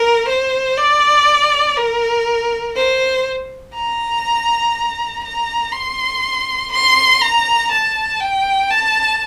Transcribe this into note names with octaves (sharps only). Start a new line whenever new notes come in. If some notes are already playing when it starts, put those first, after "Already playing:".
Already playing: A#4
C5
D5
A#4
C5
A#5
A#5
C6
C6
A#5
A5
G5
A5